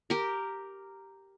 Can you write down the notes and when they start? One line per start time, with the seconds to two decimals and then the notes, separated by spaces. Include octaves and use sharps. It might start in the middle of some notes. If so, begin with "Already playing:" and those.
0.10 G4 A#4